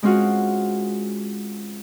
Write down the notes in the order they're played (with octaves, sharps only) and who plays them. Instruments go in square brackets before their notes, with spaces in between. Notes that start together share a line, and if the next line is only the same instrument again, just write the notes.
[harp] G#3 C4 C#4 F4 F#4 G#4